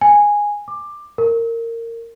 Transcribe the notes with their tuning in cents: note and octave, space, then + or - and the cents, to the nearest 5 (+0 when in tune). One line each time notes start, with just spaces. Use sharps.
G#5 -10
D6 +15
A#4 -20